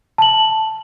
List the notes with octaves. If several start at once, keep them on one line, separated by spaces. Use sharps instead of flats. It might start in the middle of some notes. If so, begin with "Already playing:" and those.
A5 F#7